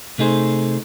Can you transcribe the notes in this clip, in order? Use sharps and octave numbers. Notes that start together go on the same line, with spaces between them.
C3 A3 D#4 G#4 C5